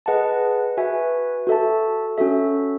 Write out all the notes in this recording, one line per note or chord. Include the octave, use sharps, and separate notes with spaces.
G#4 B4 D#5 F#5 A5
F#4 B4 E5 G#5
F#4 A4 E5 A5
C#4 F#4 A4 E5